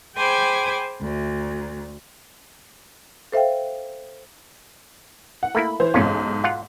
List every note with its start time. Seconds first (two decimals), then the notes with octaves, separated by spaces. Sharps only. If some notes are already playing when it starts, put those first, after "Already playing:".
0.15 G#4 C5 G5 G#5 B5 D6
1.00 D2
3.32 A4 C5 E5 F5 G5
5.43 F#5
5.55 A3 A#3 E4 B5
5.80 E3 C5
5.94 B1 E2 G#2 C#4 F4
6.44 F4 F5 F#5